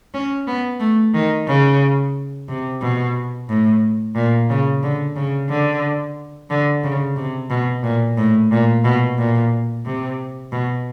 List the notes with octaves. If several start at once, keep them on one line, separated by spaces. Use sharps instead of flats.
C#4
B3
A3
D#3
C#3
C3
B2
A2
A#2
C#3
D3
C#3
D3
D3
C#3
C3
B2
A#2
A2
A#2
B2
A#2
C3
B2